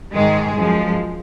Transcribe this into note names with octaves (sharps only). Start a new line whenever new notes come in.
G#2 D#3 G#3 G#4
F#2 F3 G#3